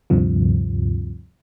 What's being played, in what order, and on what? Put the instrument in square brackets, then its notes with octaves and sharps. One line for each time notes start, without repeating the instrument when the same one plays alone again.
[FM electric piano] D2 G2 C3 F3